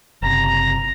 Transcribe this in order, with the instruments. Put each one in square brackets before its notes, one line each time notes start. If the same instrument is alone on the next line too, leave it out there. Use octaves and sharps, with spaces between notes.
[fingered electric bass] F#1 C3 [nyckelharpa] A#5